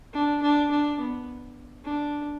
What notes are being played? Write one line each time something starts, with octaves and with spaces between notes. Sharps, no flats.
D4
D4
D4
B3
D4